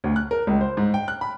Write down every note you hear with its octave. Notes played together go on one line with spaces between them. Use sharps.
D2
F#6
A#4
C#2
C5
G#2
G5
F#6
B5